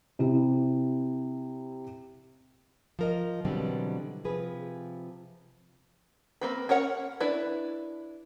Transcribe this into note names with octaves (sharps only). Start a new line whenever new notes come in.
C3 E4 G4
F3 A#4 D#5
B2 D3 E3 F#3 G3 C4
C3 F3 G#4 B4
A#3 C4 B4
C#4 A#4 C#5 F#5
D4 E4 B4